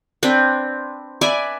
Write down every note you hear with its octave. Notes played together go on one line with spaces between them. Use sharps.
C4 D4 B4
B4 D5 E5 G#5